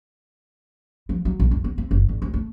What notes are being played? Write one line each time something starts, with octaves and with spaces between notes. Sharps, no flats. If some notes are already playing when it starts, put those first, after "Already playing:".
F3
F#3
A#1
F2
B3
C4
F#1
G#1
D2
A3